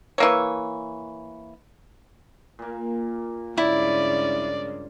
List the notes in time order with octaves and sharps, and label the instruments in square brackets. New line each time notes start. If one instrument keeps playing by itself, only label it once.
[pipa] E3 A#3 C#5
[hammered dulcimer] A#2 A#3
[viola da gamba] G2 C#3 G#3 [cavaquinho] E4 [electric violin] D5